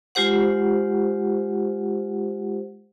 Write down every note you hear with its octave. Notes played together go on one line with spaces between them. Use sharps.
G#3 F4 G4 C5 F#5